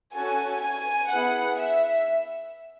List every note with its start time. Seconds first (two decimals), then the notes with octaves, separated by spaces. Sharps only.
0.14 C#4 F#4 A4 G#5
0.62 G#5
1.11 B3 E4 G#4 F#5
1.59 E5